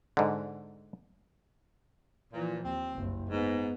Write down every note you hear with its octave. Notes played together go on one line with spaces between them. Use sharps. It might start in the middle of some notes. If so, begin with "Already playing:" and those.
G#2 D3
A#2 E3 F3
D#2 C4
F#1 C2
G#2 B3